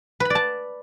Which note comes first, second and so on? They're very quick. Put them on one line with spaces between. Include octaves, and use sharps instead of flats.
B4 B5 D5 A5